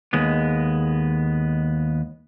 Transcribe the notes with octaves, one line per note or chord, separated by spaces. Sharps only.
D#2 G#3 B3